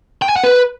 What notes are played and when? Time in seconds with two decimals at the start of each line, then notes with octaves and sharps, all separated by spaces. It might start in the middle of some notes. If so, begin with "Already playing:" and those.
0.22 G5
0.29 G#5
0.36 F#5
0.44 B4